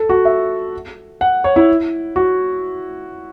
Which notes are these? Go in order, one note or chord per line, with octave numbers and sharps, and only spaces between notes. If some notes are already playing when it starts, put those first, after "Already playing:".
Already playing: A4
F#4
E5
F#5
C#5
E4
F#4